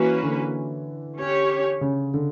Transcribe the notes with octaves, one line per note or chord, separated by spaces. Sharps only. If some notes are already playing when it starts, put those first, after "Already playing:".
Already playing: E3 A#3 C#4 F#4 B4
D3
C#4 G4 C#5
C#3
D3